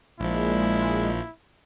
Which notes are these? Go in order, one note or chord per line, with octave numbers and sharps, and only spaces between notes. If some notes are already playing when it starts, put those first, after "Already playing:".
A#1 A#2 F3 G#3 E4